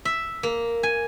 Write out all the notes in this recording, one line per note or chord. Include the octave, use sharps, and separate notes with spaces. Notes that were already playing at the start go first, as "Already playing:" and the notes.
E5
A#3
G#5